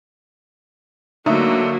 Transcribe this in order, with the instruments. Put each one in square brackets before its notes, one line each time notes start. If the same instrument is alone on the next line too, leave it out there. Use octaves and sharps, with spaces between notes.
[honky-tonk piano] D3 A3 D#4 [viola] F#3 A#3